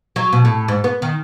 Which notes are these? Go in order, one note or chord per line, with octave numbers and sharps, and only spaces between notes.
F#3
B2
A2
G#2
B3
D#3